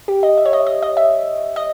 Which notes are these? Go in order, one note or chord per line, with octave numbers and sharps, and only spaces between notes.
G4
D#5
E5
C#5
D#5
D#5
D#5
E5
D#5